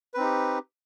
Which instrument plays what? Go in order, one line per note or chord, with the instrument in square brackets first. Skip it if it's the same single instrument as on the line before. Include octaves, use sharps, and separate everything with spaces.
[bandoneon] B4
C4
D#4
G4